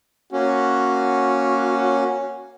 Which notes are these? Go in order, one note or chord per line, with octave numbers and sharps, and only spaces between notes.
A#3 C#4 F#4